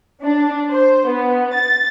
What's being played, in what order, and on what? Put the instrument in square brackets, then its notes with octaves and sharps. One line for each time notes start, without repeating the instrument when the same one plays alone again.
[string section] D4
C5
B3
A6